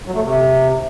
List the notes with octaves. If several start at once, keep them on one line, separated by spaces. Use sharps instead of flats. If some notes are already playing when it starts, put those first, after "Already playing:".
F#3
A3
C3